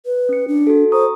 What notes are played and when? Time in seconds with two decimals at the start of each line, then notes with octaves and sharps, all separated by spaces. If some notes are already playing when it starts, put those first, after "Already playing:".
0.06 B4
0.29 C#4 C#7
0.48 D4
0.67 F#4 A4
0.92 C5 A#5 C#6 D#6